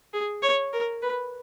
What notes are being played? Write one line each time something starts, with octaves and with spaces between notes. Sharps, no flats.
G#4
C#5
A#4
B4